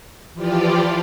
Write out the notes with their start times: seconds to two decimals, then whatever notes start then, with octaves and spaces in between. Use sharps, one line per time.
0.34 E3 F3 F4 G4 D5